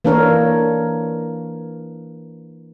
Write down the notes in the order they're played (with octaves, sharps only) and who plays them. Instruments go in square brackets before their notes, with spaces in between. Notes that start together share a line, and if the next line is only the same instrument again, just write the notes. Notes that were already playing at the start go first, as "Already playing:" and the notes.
[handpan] E3 A#3 D4 A4 A#4 C#5